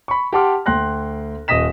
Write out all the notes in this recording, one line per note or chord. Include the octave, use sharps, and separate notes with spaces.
B5 C#6
G4 F#5 A5 C6 D6 F6
D2 G5 C6 F#6 A#6
D#1 D#5 D#6 A#6 B6 E7